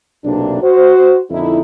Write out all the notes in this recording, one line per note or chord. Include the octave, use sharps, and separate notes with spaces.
B1 E2 C3 A#3 D4
F#4 C5
F2 A#2 D3 D#4 E4